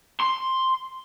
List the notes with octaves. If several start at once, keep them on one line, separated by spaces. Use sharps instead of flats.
C6